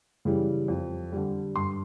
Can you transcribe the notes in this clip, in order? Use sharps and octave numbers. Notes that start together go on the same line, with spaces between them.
C#3 E3 G3
F2
D3 G3
G2 C6